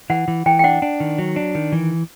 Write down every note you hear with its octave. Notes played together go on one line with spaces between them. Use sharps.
E3 F#5
E3
E3 G5
G5
D4 F#5
D4
D#3
F#3
D4
D#3
E3